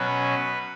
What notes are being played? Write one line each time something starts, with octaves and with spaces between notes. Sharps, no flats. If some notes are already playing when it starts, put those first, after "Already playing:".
Already playing: B2 F#3 C#4 B4